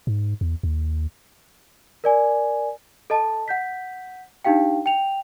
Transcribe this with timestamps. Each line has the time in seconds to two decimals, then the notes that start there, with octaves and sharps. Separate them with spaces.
0.07 G#2
0.41 E2
0.63 D#2
2.04 A#4 D5 G#5
3.10 A4 D#5 A5
3.48 F#5 G6 B6
4.45 D4 D#4 G4 F5 G5
4.86 G5 F7